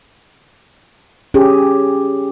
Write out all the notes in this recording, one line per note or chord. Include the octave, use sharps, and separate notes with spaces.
C#4 G4 G#4